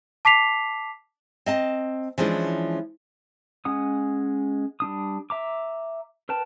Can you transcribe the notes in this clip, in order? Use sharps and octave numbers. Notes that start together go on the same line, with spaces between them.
A5 D6 B6 C7 F7
C4 D#5 A5
E3 F3 G#3 C#4 D4
G#3 C#4 F#5 D#6
G3 D4 D#6
E5 A#5 D6
A#4 B4 G5 A5